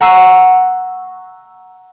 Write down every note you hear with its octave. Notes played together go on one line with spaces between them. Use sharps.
F#5 A#5 C#6 E6 C7 D#7